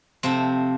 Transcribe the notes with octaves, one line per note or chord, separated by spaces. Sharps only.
C3 F3 A3 C4